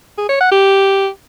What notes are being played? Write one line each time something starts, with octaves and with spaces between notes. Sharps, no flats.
G#4
C#5
F#5
G4